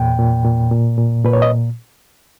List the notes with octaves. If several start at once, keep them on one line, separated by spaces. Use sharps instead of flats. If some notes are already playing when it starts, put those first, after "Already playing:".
Already playing: E2 A#2 G5
A#2
A#2
A#2
A#2
A#2 B4
C#5
D#5